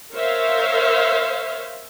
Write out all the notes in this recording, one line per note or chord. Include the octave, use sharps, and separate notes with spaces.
A#4 C5 C#5 E5 F5